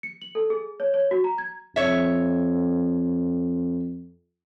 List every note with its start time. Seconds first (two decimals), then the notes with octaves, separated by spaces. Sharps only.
0.03 C#7
0.22 F#7
0.35 A4
0.50 G#4
0.80 C#5
0.94 C#5
1.11 F#4
1.24 A#5
1.38 G#6
1.76 F2 C#5 E5